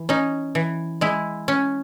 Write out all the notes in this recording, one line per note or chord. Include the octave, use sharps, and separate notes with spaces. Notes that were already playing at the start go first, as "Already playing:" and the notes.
Already playing: E3
C#4 D#4
E3
G#3 E4
C#4